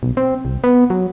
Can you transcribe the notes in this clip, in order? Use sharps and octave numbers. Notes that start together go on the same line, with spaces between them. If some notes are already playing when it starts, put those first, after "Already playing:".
B1
C4
C2
B3
F#3